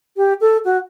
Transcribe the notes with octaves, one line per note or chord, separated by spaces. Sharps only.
G4
A4
F#4